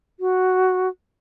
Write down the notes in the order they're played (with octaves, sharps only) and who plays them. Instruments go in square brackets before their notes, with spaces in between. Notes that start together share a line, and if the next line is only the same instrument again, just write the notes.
[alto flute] F#4